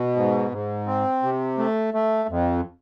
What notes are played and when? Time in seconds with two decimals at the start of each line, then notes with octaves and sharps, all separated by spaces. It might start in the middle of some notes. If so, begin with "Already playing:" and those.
Already playing: B2
0.16 G#2
0.51 G#2
0.86 C4
1.23 C3
1.58 A3
1.94 A3
2.29 F2